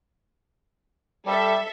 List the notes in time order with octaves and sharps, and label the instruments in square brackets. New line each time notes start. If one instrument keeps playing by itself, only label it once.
[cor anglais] G3 [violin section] A4 E5